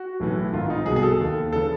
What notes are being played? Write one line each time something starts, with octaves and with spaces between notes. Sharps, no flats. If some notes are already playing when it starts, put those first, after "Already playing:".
Already playing: F#4
B1 A2 E3
G#1 G#2 D#3 F4
D#4
C2 B2 G#4
G#4
A4
D#2 D#3
C#3 E3 A4